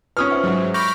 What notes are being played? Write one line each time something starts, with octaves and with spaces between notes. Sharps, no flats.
C#4 D#4 F4 B4 D#6 F6
C5 E5 F#5
G#2 F#3
B5 C#6 D6 F6 G6 A#6